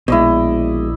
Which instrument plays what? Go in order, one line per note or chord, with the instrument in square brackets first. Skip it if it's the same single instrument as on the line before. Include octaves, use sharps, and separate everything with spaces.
[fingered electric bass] A#1 [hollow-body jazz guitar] B2 G#3 [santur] E4 D5 D#5